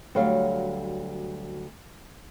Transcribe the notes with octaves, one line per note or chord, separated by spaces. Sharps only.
D2 F#3 G3 C#5 F5